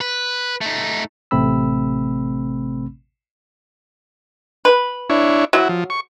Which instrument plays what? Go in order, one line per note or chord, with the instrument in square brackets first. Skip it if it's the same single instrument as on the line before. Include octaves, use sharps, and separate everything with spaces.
[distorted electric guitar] B4
A3 D#4
[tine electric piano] A1 C3 A3 C4 B5 E6
[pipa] B4
[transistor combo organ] D4 E4 C#5
[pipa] F#3 [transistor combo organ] E4 F#4
[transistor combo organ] F3
C#6